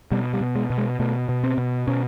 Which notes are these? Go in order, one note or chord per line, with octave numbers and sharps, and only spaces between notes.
B2 G3
G3
B2
G#3
B2
G#3
B2 A3
B2
C4
B2
B2 C#4